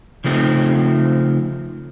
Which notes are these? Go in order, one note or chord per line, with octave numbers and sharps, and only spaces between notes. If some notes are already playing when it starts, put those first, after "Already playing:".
C#3 F3 A3 C4 D#4